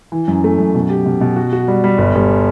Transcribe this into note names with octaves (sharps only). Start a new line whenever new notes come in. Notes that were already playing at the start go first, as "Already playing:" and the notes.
E3
F#2
A3
F#2
B2
G4
B2
B2
F#4
F#4
G3
G3
G1
G1